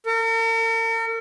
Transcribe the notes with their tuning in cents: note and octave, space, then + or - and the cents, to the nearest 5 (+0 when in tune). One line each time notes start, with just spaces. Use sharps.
A#4 -45